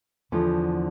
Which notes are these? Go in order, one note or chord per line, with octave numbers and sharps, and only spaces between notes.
E2 D3 F3